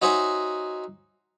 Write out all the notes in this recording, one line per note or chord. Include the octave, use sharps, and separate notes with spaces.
D#4 F#4 C5 C#5 E5 G#5